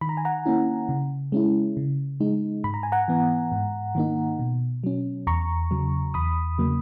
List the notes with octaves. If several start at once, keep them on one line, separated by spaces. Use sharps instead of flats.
D#3 B5
A#5
G#5
F#5 A#5
A#3 C#4 E4
C#3
G#3 C#4 E4
C#3
G#3 D#4
G#2 B5
A#5
G#5
F#5 A#5
E3 B3
G#2
D#3 A#3 D#4
B2
F#3 C#4
E2 A#5 C#6
C#3 F#3
E2 B5 D#6
C#3 F#3 A#3